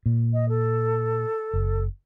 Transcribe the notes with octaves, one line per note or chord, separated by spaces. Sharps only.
A#2
D#5
A4
F#1